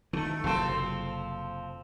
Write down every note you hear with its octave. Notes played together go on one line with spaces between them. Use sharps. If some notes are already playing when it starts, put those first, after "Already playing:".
D#3 E3 A3
F#1 C3 F3 C4 A4